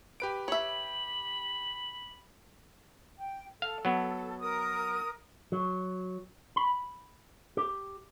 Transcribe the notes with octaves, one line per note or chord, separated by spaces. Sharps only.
G4 B4 D7
C#5 E5 B5 F#7
G5
A4 F5
F#3 B3
A#4 D#6
F#3
B5
G4